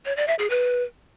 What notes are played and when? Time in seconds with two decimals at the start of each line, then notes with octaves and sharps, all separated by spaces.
0.06 C#5
0.17 D5
0.28 E5
0.39 G#4
0.50 B4